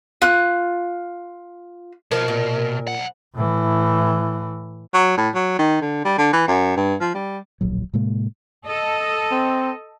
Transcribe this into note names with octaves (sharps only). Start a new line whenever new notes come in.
F4 F#6
B2 F3 A#4
A#2
B1 F#5
A2 E3
F#3
A2
F#3
D#3
D3
G3
D3
E3
F#2
G2
F3
G3
D1 A#1 F#3
A2 C3 G#3 A#3
A4 D#5
C4